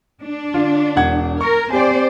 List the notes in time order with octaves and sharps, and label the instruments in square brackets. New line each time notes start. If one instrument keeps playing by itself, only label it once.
[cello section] D4
[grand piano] D3 F4
E1 F#5 G#6
[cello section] A#4 [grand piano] C#6
[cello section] C4 C5 D5 [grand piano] G4 G#5